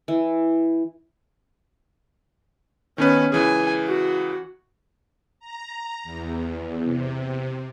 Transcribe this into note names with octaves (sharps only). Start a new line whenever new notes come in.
E3
D#3 B3 C#4 B4 G#5
C#2 E3 G#4 G#5
F#4
A#5
E2
C3